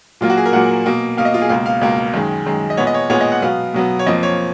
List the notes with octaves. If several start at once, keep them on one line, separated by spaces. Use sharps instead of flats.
A#2 F#3 A#3 F4
F#4
G#4
A#4
A#2 F#3 A#3 F#5
B2 A#3
B2 A#3 F5
D#5
F4
G#4
C#2 B2 A#3 F5
F5
C#2 B2 A#3
F#2 D#3 G#3
F#2 D#3 G#3
D#5
A#2 G#3 B3 C#5
D#5
C#5
A#2 G#3 B3 C#5
D#5
F#5
B2 F#3 B3 F5
B2 F#3 B3
C#5
F2 F3 A#3 D#5
C#5